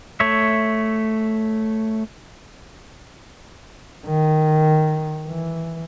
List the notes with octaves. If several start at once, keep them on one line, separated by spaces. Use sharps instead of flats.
A3 C#5 E5
D#3
E3